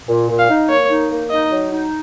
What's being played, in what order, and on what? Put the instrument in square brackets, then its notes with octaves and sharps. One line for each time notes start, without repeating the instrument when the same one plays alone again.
[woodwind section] A#2
A#2
[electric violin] F5
[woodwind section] D#4
[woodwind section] A#3 [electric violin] C#5
[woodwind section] D#4
A#3
[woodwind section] D#4 [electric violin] D#5
[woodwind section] F#3
D#4